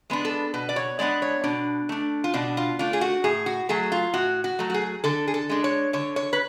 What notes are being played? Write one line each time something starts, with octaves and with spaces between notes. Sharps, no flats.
G#3 B3 D4
A4
B2 B4
D5
C#5
G#3 B3 D4 D5
C#5
B2 D4
A3 D4
F4
B2 D4
F4
A3 D4 F4
G#4
F#4
A2 G#4
F#4
F#3 A3 G#4
F4
A2 F#4
F#4
F#3 A3
F#4
G#4
D3 A4
G#4
A4
G#3 D4
C#5
D3 C#5
C#5
B4